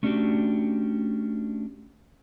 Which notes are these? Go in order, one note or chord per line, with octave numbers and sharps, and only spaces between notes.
A3 C#4 D4 E4 F#4 G4